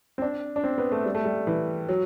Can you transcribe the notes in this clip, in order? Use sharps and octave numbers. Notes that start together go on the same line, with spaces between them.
C4
D4
D4
C4
B3
A3
G3
A3
G3
E3
F#3